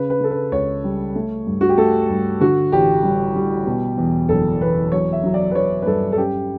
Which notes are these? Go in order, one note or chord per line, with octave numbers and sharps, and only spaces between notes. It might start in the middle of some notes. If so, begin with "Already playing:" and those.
Already playing: C#3 B4
B4
C#3 A4
B4
C#2 C#5
G3
A3
G2
F#4
G4
A3 A4
G2
D3 F#4
A1 G4
G3
G3
B2
E2
F#1 A4
E2 B4
F#3 C#5
E5
F#3
D5
B4
F#3 C#5
B4
G2 A4
A4
C#4 G4